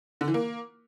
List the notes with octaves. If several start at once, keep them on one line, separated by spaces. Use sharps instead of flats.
D3
E3
A#3